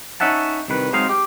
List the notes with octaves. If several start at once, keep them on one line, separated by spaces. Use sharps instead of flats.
C#4 D#4 E5 F#5 A5
C2 D#3 B4
F#3 G#3 C4 D#4 F5
G4